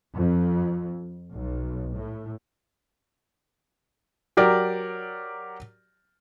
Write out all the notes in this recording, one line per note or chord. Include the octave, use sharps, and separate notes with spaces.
F2
B1
A2
F#3 G4 A#4 D5